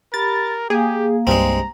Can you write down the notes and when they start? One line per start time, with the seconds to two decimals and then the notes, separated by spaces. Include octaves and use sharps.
0.14 G4 A#4 B5 A6
0.70 A#3 G4 G#4 F5
1.27 C2 G2 G#3 C4 A#5